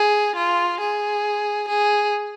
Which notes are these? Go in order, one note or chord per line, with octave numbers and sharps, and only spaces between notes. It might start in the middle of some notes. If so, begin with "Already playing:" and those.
Already playing: G#4
F4
G#4
G#4